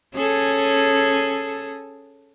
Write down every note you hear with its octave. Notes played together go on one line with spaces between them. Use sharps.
C#4 G#4 A4